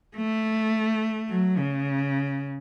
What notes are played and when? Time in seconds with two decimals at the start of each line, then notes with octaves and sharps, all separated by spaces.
0.16 A3
1.29 F#3
1.58 C#3